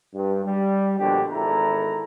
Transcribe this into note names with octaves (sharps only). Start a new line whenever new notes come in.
G2
G3
A#1 B2 D3 D4 G4
G#1 E2 E4 A4 A#5